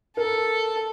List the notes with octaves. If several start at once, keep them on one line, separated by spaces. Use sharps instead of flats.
A4 A#4